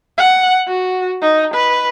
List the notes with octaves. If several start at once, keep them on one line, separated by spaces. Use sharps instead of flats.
F#5
F#4
D#4
B4